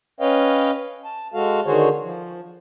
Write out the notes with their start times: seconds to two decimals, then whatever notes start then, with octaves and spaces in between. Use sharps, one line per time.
0.20 C#4 B4 C#5 D#5 F5 G5
1.05 A5
1.34 G#3 F#4 A4 F5
1.66 D3 D#3 F#4 G#4 C5 C#5
2.03 F3